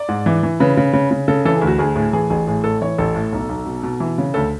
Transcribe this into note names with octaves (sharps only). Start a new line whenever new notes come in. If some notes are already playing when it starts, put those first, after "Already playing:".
Already playing: D5
G#2
E3
E3
C#3 B4
C#3
C#3
C#3
C#3 A4
E3 A4
D2 G#4
F#4
D2 G#4
A2 G#4
E3 G#4
A1 G#4
A2 G#4
A2 A4
E3 C#5
A1 A4
A2
B1
B1
B2
B2
E3
C#3
D2 A4